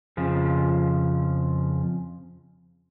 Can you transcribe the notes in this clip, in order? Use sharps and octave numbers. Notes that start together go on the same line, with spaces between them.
F2 C#3 F3